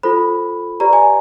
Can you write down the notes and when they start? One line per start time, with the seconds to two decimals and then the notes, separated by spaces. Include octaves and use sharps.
0.03 F4 A4 C5 B5
0.80 G4 B4 D5 A#5
0.93 G#5